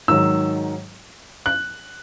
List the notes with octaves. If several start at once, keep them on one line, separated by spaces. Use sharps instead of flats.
G#2 D#3 F#3 E6
F#6